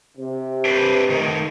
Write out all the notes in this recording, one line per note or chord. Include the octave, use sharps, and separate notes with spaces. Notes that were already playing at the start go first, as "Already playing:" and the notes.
C3
D4 B4 C5
D#3 A3 D#4